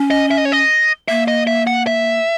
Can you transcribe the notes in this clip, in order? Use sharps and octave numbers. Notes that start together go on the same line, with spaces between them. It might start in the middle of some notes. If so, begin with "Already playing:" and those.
Already playing: C#4
D#5
E5
D#5
C#5
D#5
A#3 E5
D#5
E5
F#5
E5